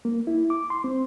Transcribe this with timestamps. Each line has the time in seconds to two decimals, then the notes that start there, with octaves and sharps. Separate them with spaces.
0.05 A#3
0.27 E4
0.50 D6
0.70 C6
0.84 C4